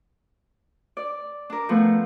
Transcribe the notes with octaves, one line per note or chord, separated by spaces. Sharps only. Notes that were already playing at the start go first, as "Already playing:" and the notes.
D5
D4 A#4
F3 A3 B3